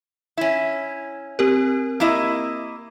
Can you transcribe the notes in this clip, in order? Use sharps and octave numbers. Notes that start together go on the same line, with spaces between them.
C#4 E4
C4 G4 A#4
A#3 E4 D#5